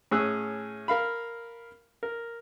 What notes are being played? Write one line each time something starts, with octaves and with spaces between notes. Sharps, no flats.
A2 C#4 G#4 E6 F#6
A#4 F5 B5
A#4